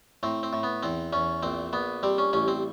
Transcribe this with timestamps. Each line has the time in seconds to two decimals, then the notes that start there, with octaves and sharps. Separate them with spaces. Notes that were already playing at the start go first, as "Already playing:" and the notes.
0.23 A2 C4
0.43 C4
0.53 A2
0.63 B3
0.83 E2 C4
1.13 E2 C#4
1.43 A#1 C4
1.73 A#1 B3
2.03 G3 C4
2.18 C#4
2.33 A1 C#4
2.48 C4